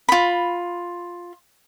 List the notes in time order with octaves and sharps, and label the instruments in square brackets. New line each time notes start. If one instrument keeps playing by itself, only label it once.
[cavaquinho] F4 B5